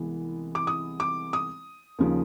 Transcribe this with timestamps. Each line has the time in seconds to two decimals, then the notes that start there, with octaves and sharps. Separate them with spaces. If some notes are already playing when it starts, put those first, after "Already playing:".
Already playing: C2 E3 G#3 B3
0.55 D6
0.67 D#6
1.00 D6
1.33 D#6
1.99 D#2 C#3 F3